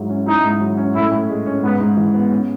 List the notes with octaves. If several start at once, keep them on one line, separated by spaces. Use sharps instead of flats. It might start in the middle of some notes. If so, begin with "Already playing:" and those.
Already playing: G#2 F#3 E4
C#4
D#4 E4
G#2
F#3
C#4
A2 E4
A2
G#3
C#4
G#2 B3
G#2
E3
B3
C#4